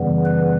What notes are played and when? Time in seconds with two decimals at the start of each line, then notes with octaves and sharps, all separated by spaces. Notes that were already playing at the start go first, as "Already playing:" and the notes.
Already playing: F#2 C#3 E3 G3 B3
0.26 B4